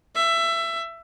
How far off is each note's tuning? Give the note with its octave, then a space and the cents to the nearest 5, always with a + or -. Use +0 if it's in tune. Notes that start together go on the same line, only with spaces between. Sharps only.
E5 +20